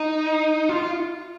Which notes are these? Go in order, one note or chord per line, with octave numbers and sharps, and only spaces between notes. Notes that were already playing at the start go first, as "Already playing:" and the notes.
Already playing: D#4
F4